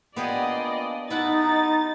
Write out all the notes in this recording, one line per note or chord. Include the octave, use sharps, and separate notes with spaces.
A#3 B3 D4 F4 G4 G#4 D5 D#5
D#4 E4 F#5 A5 A6